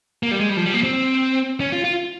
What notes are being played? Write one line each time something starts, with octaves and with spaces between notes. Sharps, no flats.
A#3
G3
G#3
G3
F3
G3
A#3
C4
C#4
F4
F4